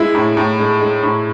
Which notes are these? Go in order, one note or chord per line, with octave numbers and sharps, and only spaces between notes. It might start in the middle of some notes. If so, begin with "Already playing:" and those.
Already playing: G#3 E4
A2
A2
G#3
G#3
A2